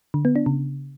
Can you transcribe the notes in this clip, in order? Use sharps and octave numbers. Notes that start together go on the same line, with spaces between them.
D3
B3
D4
C#3